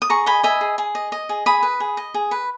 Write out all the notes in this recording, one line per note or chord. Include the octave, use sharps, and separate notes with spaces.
D#6
G#4 A#5 C#6
D#5 G#5 B5
D#5 E5 G#5
G#4
G#4
D#5
D#5
G#4
G#4 B5 D#6
B4
G#4
D#5
G#4
B4